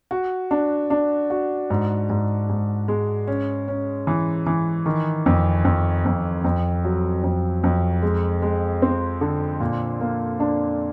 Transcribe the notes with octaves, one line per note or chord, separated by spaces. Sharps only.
F#4
D4
D4
F#4
G#2
G#2
G#2
G#3
C#4
C#4
E3
E3
D#3
F2
F2
F2
F2
F#3
F2
F2
G#3
G#3
C4
D3
A#2
A#3
D4